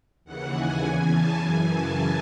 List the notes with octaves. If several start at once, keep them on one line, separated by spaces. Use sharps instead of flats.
D#2 C#3 E3 F#5
G#5
E2 C#3 E3
A5
F#2 C#3 E3 G#5
A5